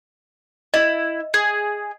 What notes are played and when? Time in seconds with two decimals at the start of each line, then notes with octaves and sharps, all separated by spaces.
0.74 E4 D#5
1.34 G#4